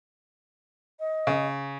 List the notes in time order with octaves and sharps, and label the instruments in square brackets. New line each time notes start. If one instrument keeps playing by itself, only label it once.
[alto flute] D#5
[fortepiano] C#3